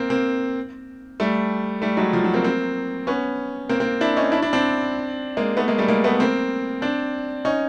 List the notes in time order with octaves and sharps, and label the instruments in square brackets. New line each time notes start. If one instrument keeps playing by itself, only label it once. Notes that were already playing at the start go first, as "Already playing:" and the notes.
Already playing: [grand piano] A#3 C4
A#3 C4
G3 A3
G3 A3
F#3 G#3
F3
F#3
A#3 C4
A#3 C4
B3 C#4
A#3 C4
A#3 C4
D4 E4
C#4 D#4
D4 E4
D4 E4
C4 D4
G#3 A#3
A3 B3
G#3 A#3
G3 A3
G#3 A#3
A3 B3
A#3 C4
C4 D4
C#4 D#4